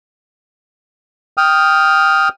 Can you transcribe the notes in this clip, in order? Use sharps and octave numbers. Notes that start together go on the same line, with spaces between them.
G5 D#6 F6